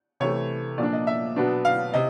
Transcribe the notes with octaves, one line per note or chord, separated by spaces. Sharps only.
C3 E3 A3 C#5
A#2 F3 A#3 D4 D5
D#5
E5
B2 F#3 B3 D4
F5
C3 D#5